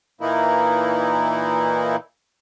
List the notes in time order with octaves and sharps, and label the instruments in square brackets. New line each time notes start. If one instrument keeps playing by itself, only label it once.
[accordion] A#2 E3 A#3 D#4 E4